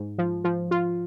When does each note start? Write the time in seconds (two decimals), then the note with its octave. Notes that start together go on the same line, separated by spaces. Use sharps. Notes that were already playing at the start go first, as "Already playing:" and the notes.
Already playing: G#2
0.18 F3
0.44 F3
0.71 F4